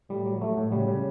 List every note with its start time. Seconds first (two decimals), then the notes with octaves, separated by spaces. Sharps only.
0.09 A2 G3
0.26 F#3
0.41 F#3 A3
0.56 A2
0.72 C#3 G3
0.88 C#3